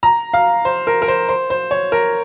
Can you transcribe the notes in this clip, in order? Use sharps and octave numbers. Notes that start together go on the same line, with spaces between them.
A#5
F5
C5
A#4
A#4
C5
C5
C5
C#5
A#4